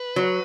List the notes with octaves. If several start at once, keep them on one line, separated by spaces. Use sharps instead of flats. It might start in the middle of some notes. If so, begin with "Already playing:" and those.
Already playing: B4
F#3